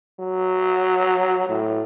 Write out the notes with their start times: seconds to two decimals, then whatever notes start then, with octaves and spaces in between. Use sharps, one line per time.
0.19 F#3
1.49 A2